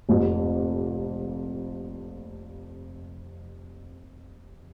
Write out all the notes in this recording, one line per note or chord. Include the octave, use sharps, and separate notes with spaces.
F1 F2 C3